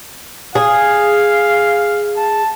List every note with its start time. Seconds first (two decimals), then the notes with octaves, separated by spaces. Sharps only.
0.55 G#4 F5
2.17 A5